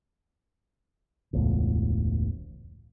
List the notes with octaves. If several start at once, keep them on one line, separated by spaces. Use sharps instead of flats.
E1 C#2 A2